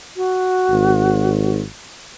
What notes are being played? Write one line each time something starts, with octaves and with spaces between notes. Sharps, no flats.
F#4
G#1